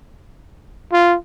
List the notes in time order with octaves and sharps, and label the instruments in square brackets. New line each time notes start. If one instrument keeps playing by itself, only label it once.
[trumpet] F4